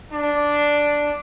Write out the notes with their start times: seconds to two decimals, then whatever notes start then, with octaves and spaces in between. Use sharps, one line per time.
0.12 D4